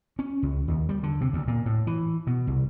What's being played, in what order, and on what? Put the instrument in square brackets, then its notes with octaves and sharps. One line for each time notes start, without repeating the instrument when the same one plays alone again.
[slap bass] C#4
C#2
D#2
G3
D3
C3
D2
A#2
A2
E3
B2
C2